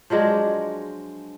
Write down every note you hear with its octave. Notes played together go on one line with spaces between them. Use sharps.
F3 F#3 G#3 D4